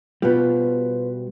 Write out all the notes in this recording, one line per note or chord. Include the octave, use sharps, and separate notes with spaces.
B2 G3 F4 B4 C5